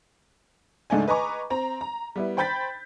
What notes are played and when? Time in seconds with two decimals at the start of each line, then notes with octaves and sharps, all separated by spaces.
0.90 C#2 G#2 A3 D4 D#4 G#5
1.08 B4 D#5 G#5 A#5 C#6 D6
1.50 C4 A#5
1.81 A#5
2.16 G3 B3 E4
2.37 C5 G5 B5 G6 A6 B6